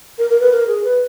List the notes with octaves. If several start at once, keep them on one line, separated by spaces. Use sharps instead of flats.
A#4
A#4
B4
A#4
G#4
B4